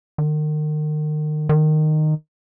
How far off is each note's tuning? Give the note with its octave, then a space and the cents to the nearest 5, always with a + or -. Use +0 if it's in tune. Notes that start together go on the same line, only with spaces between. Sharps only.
D#3 -35
D#3 -15